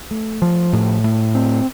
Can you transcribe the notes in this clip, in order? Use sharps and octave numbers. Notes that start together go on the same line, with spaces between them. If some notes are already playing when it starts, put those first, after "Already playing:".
A3
F3
A2
A2
C4